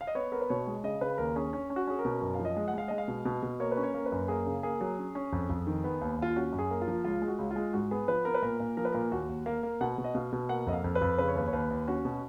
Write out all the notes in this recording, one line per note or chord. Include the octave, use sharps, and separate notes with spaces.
F5
D#5
B3 C#5
B3 A#4
B4
B2 C#5
G#3
C#3 D#5
C#3 B4
D#2 A#4
C#4 G#4
C#4
C#4
F#4
C#4 G#4
A#4
B2
F#2 A#4
F5
F3
D#5
G#3
F#5
G#3 F5
G#3 D#5
F5
B2
B2
B2
A#3 C#5
B4
C#4
C#5
A#3
B4
F#2
A#3 G#4
C#3
A#3 G#4
F#3
C#4
C#4
F2
F2
D#3
B3
D#2
D#2 F4
C#4 F#4
F#2
G#4
A#3
F4
F3
C#2 F4
G#3
F#4
C#2
F4
G#3
G#2 F#4
B3 G#4
F3 B4
B3 A#4
B4
A#2 A#4
A#2
F3 A#4
B4
A#2 A#4
D#2 F#4
D#2
A#3 F5
A#3
B2 F#5
B2
D#5
B2 F5
B2
A#3 F#5
F2 D#5
F5
F2
B4
F2
C#3 B4
C#5
D#2 B4
C#5
D#2 B4
D#2
C#4 F#4
B2